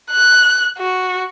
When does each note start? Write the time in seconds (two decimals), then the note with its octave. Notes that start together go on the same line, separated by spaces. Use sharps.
0.11 F#6
0.78 F#4